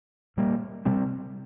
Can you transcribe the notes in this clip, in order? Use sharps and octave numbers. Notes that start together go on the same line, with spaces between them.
A#2 G3 A#3
C3 G3 C4